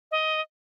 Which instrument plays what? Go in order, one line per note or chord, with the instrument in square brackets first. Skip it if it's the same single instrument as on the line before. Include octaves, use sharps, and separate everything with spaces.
[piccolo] D#5